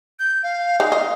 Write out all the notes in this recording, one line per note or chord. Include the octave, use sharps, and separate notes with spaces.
G6
F5
G#3 D#4 F5
D#5